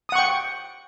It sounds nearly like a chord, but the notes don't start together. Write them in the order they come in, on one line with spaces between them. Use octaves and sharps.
D#6 F#5 C#6 G5